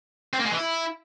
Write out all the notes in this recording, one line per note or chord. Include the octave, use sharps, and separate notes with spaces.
C4
A#3
G#3
E3
E4